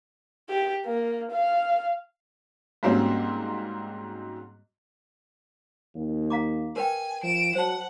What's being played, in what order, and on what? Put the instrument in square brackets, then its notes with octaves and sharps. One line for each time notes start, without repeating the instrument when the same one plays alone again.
[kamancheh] G4
A#3
F5
[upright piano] G#2 F#3 G3 A#3 C4 C#4
[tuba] D#2
[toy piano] F5 A#5 D6
[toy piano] A#4 B4 G5 [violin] G#5
[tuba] F3 [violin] D7 E7
[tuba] F#3 [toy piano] C5 A5 [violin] F#5